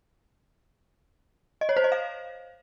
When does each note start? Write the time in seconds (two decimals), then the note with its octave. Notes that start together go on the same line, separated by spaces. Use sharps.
1.61 D#5
1.69 C#5
1.77 C5
1.84 D#5
1.92 F5